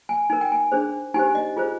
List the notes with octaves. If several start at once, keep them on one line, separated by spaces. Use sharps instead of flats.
G#5
D#4 A#4 G#5
G5
G#5
D4 G#4 C5
D#4 G4 C5 G#5
D#5
F4 G#4 C5